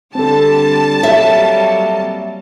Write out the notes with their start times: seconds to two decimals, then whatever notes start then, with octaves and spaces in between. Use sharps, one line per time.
0.15 D3 G3 C4 A4 A5
1.03 F#3 G3 A#3 E5